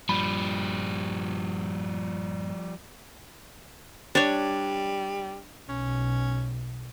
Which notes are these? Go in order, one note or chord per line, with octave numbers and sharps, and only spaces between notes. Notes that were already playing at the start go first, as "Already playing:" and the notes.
G2 A#2 F3 G3 B5
G3 D4 C#5
B1 C#4